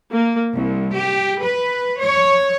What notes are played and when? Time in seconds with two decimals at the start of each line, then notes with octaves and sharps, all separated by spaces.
0.12 A#3
0.53 C2
0.94 G4
1.42 B4
2.00 C#5